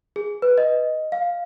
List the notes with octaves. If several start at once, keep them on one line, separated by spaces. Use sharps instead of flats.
G#4
B4
D#5
F5